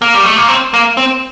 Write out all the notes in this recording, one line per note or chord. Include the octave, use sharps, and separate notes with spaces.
A#3
G3
A3
A#3
C4
A#3
C4